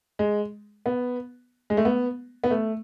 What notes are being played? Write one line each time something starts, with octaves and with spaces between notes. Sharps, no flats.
G#3
B3
G#3
A3
B3
B3
A3